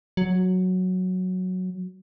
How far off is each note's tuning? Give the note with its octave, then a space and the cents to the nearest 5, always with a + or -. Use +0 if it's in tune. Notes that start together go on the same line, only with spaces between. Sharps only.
F#3 -5